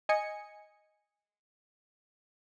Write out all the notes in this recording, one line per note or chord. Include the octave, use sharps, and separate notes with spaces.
D#5 G#5 C#7